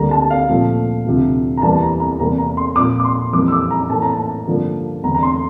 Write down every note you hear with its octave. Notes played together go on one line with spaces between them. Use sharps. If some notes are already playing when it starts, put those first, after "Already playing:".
Already playing: D2 D3 G3 A#3 A#5
A5
F5
A#2 F3 A3
D2 C3 F3
A#5
E2 E3 G3 A#3 A5
A#5
A#5
E2 C3 G3 A#3 A#5
A#5
C6
A#2 F3 A#3 D6
D6
C6
F2 E3 G3 A#3 D6
E6
D6
A#5
A2 E3 A#3 A5
A#5
A5
G2 D3 F3 A#3
E2 D3 A3 A#5
A#5
C6